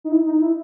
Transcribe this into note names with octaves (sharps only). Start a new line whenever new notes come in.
D#4
E4
D#4
E4